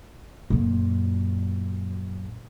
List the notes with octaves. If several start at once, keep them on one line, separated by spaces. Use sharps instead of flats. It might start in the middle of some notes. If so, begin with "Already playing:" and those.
F#2 A#2